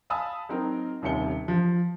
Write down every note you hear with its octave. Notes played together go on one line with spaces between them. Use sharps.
F5 G#5 A5 B5 D#6 E6
F#3 C4 D#4 A#4
D#1 D#2 C3 C#4 C#7 G7
F3